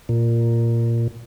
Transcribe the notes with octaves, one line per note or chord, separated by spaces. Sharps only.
A#2